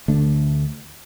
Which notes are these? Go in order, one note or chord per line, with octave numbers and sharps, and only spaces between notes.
D2 D3 A3 D4